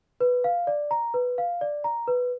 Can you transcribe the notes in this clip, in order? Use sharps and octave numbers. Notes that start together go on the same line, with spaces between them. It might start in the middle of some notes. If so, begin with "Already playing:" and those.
B4
F5
D5
A#5
B4
F5
D5
A#5
B4